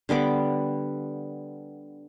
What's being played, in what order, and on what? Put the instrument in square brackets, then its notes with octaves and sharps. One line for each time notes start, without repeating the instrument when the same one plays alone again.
[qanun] D3 G3 B3 D6